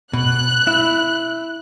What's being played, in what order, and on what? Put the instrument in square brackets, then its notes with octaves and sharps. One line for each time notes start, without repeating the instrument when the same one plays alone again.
[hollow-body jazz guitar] B2 [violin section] F#6
[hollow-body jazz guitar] E4